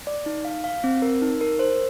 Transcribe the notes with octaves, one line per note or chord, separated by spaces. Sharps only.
D5
D#4
F5
F5
C4
A#4
D#4
A#4
C5